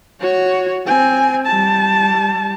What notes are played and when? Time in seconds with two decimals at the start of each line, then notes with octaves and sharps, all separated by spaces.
0.20 F#4 C#5
0.86 C4 G#5
1.46 G3 A5